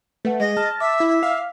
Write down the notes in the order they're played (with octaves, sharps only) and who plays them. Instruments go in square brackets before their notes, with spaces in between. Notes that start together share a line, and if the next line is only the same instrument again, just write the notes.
[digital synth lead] A3 [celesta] B4 F#5
[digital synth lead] G#3 [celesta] G#4 [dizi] D#5
[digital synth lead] A5 [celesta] F6
[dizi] E5 [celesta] D6
[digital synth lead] E4
F5